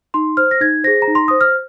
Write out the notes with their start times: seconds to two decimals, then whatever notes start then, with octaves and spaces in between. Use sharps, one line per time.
0.14 D#4 C6
0.37 C5 F6
0.51 A#6
0.61 D#4 G#6
0.84 G#4 C5 A#6
1.02 A#5
1.07 D#4
1.15 C6
1.28 C5 D#6
1.41 F6